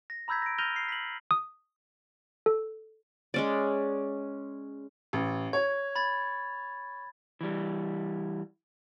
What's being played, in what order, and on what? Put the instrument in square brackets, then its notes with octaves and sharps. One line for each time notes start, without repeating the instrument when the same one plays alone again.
[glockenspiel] A#6
A#5 B5 E6 G6 G#6 B6
A#6 D7
F6 G6 A#6 D#7 F7 G7
C7
B6 F#7
[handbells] D#6
A4
[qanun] G#3 C#4 D5
[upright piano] A1
[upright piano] C#5 [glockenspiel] G#6
[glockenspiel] B5 G#6 A6
[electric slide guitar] E3 G3